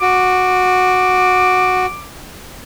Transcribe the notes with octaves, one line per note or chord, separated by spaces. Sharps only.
F#4 D6